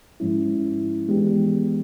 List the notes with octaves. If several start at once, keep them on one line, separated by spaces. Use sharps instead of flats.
G#2 F3 G#3 C#4 E4
E3 G#3 B3 D4 G4